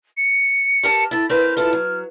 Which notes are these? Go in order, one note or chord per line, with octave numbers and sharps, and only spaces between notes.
C#7
G4 A#4 A5
E4 A4 A6
C4 A#4 B4 G6
E4 F4 A4 F6
F#3